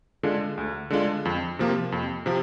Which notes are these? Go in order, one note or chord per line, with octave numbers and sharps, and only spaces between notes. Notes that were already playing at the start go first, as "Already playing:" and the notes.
D3 G#3 D4 F4
D2
D3 G#3 D4 F4
F2
C3 F3 A#3 F4
F2
C3 F3